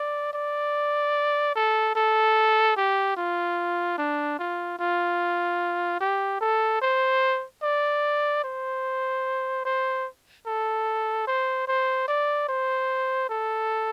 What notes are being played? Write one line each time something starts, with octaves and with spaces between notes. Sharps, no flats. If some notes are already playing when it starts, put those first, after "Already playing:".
Already playing: D5
D5
A4
A4
G4
F4
D4
F4
F4
G4
A4
C5
D5
C5
C5
A4
C5
C5
D5
C5
A4